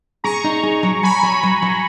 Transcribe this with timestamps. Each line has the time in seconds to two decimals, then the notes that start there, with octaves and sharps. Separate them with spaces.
0.24 G#4 A#5 C#6
0.44 D#4
0.63 G#4
0.83 F#3
1.03 F#3 G#5 B5
1.23 F#3
1.43 F#3
1.62 F#3